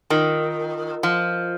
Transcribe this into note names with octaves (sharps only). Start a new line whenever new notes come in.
D#3 F4 A#4 D#5
F3